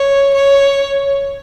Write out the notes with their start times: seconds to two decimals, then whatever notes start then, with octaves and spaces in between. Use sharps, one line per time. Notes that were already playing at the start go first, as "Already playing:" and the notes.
Already playing: C#5
0.34 C#5